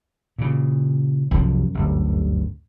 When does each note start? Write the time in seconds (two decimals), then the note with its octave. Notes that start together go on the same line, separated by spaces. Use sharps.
0.38 A#2 C#3
1.31 C2 F#2 F3
1.74 G1 D2